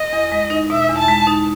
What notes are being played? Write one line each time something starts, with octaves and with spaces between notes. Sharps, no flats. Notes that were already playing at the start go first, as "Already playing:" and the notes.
Already playing: D#5
E2
G#3
D#4
B2 E5
E2
A5
G#3
D#4